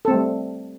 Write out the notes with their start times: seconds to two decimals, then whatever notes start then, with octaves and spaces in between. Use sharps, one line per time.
0.05 A4
0.08 C4
0.11 A3
0.13 G3